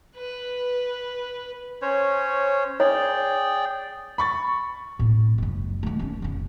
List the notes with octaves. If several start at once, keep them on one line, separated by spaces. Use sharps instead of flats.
B4
C#4 C5 C#5
G#4 C#5 D5 G5
B5 C#6 A6
A2 C4
F#1 C#2
D#3 A3
C#4 D#4
F1 C#3